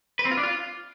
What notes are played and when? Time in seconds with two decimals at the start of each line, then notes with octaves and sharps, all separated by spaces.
0.19 B4
0.25 C4
0.31 F4
0.37 D4
0.43 F4